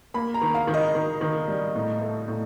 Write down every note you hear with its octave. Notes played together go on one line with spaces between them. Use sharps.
A#3 B5
A#5
D#3
F5
D#3
D#5
D#3
D#3
G3
A2
A3
A2